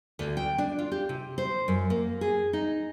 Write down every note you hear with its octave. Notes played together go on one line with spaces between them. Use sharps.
D2
G5
D4
F4
G4
C3
C5
F#2
A#3
G#4
D#4